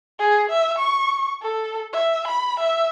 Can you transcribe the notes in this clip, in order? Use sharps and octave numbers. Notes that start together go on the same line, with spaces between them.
G#4
E5
C#6
A4
E5
B5
E5